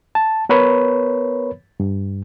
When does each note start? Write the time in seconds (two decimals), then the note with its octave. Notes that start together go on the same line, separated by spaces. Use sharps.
0.15 A5
0.49 B3 A#4 B4 C#5 B5
1.80 G2